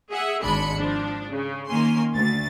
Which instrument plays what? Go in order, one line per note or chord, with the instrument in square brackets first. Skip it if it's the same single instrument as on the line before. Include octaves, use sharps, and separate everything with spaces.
[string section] G#4 E5 F#5
G#1 G#3 D4 B5 C#7
F3 D4
C#3
D#3 A#3 C#4 G#5 C6
D2 A6